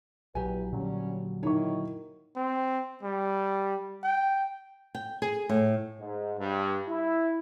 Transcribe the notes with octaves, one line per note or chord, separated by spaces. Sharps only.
A#1 E2 F#3 G4 B4 G#5
A#2 D3 F#3 G3 C#4
D#3 D#4 E4 C#5 C#6
C4
G3
G5
G5
G#4
A2
G#2
G2
E4